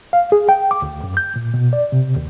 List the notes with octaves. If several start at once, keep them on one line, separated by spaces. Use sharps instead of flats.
F5
G#4
G5
D6
D2
F#2
G6
A#2
B2
D5
C3
D#2